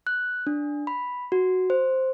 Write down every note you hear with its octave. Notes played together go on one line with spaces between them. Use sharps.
F#6
D4
B5
F#4
C5